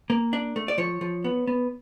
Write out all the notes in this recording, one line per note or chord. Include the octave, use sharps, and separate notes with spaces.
A#3
D4
A3
D5
F3 C#5
F3
B3
B3